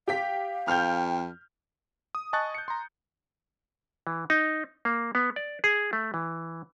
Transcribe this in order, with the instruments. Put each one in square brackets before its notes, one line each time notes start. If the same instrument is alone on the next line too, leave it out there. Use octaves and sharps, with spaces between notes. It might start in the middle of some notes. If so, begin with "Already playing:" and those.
[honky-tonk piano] G4 G5 B6 [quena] F5
[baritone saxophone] F2 [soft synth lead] G5 [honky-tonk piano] F6 G6
[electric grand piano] D#6
D#5 G#5 A5 C#6 F#6 A6
G6 C#7
A#5 C6
[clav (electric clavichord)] E3
D#4
A#3
B3
D5
G#4
A3
E3